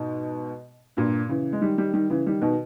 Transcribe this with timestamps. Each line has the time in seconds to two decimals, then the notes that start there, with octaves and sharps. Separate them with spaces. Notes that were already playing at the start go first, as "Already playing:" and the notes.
Already playing: G#2 B2
0.97 G2 A#2
1.29 C#3 E3
1.53 G#3
1.62 D#3 G3
1.78 D#3 G3
1.94 D#3 G3
2.10 C#3 E3
2.26 D#3 G3
2.42 B2 D#3